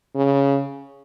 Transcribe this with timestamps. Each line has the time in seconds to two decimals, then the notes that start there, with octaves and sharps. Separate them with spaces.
0.15 C#3